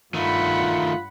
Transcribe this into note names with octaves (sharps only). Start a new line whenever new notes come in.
G2 D#3 A3 F4 F#5 B5